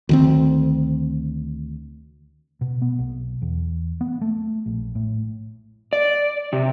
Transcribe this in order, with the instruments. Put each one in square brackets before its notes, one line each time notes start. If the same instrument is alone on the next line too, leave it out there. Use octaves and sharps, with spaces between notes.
[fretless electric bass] D2 D#3 C4
[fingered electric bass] B2
B3
B1
E2
B3
A3
A#1
A2
[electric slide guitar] D5
C3